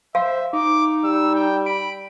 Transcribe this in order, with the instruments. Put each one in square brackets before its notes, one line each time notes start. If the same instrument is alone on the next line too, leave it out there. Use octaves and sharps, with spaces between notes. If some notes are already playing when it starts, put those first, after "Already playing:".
[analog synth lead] C5 [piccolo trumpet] E5 [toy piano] F5
[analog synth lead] D#4 [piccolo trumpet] D6
[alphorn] G3 [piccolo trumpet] E6
[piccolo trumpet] G5
[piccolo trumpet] B5 [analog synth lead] D7